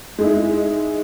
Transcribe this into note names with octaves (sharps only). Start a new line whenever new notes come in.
G#3 D#4 E4